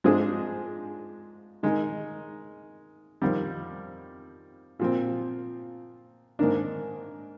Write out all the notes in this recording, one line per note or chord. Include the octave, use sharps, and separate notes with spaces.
G#2 F3 G#3 D4 G#4
D#3 G#3 D#4
F2 D#3 G3
A#2 F3 C4
G#2 D#3 A#3 D4